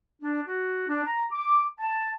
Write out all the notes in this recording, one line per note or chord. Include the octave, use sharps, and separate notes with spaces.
D4
F#4
D4
A#5
D6
A5